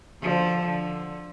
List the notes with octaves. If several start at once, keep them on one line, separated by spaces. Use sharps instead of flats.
D3 F3
D3